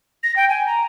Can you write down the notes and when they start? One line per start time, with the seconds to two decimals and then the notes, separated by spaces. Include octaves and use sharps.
0.23 A#6
0.36 G5
0.49 G#5
0.67 A#5